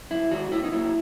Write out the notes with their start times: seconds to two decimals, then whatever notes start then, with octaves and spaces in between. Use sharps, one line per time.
0.11 F#2 E4
0.31 D#3 G#3 F#4
0.51 A#2 E4
0.64 D#4
0.72 F#3 A#3 E4